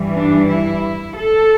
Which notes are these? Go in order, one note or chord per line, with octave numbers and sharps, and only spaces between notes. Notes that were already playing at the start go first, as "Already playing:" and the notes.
Already playing: G2 E3 G3
D4
E4
A4